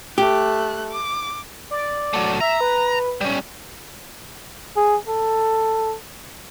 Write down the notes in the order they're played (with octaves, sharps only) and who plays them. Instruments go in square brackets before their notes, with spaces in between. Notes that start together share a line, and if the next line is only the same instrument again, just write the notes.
[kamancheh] A3 F#6 [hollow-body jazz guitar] G4
[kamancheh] D6
[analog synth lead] D5
[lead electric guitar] F#3 A3
[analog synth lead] E5 [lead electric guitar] A#5
[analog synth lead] B4
[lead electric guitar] G3 C#4
[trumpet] G#4
A4